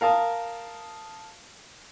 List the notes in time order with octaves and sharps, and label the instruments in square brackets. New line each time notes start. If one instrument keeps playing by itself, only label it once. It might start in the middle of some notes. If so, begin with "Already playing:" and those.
[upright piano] A#4 F5 A5 D#6